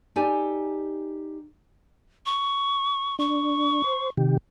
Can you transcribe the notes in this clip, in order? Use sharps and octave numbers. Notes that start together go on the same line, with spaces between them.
D#4 G4 A4 D5 G#5
C#6
D4 C#6
C5
C3 D#3 G4